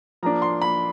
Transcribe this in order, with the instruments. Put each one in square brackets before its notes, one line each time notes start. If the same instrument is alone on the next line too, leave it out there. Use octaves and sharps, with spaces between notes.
[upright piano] F3 A#3 D4 A#5
C6
B5